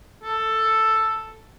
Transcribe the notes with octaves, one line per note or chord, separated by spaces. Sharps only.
A4